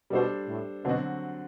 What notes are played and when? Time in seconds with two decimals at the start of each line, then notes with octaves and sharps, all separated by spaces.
0.10 B2 G3 D4 A4 C5
0.48 A2
0.84 B2 D3 F#3 C4 F#4